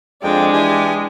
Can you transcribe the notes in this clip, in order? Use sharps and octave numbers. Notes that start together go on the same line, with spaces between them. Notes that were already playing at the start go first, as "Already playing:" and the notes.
F2 G#3 D4 G5
E3 G4 G#5